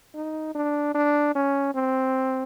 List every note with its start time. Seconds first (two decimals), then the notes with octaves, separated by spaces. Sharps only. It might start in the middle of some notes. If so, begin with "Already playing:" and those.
0.15 D#4
0.55 D4
0.94 D4
1.35 C#4
1.74 C4